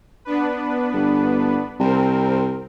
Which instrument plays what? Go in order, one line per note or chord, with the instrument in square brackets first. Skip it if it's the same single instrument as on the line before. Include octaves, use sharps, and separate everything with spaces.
[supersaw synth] B3 D4 B4
[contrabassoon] G1
[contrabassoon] C2 [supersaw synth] C4 A#4